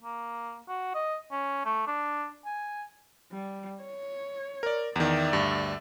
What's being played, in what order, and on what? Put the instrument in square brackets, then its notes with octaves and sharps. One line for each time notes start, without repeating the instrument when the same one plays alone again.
[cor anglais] A#3
F#4
D#5
C#4
A3
D4
G#5
[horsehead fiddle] G3
C#5
[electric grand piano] A#4 D5
[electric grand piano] E2 D#3 [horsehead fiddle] D5 E5
[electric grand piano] D2 G2